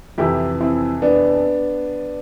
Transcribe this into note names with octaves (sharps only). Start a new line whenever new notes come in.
F2 C3 E3 E4 G4
C4 E4
B3 D4